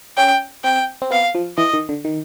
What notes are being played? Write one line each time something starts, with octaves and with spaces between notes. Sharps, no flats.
C#4 G5
C4 G5
C4
B3 F5
F3
E3 D#5
D#3
D3
D#3